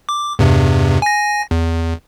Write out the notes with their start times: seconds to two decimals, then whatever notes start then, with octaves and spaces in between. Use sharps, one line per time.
0.09 D6
0.39 E2 G2 C3
1.02 G#5 A#6
1.51 E2